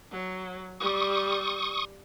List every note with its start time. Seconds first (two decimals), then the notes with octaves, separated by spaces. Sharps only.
0.11 F#3
0.80 G3 C#6 D#6